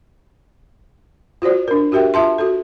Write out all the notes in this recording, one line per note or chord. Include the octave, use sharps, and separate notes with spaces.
F4 F#4 C5 D5
D4 A#4
F#4 G4 A#4 E5 G5
F4 E5 A5 C6
F#4 A4